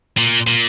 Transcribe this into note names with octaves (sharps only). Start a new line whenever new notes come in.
A#2
A#2